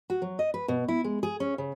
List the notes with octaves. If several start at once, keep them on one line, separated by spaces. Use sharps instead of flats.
F#4
F#3
D#5
B4
B2
E4
G#3
G#4
C#4
C#3